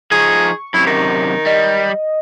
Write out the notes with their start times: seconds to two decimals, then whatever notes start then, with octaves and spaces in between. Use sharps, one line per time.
0.12 F3 D#4 G#4 C#6
0.74 F#2 C3 E4
0.87 D#3
1.46 G3 D#5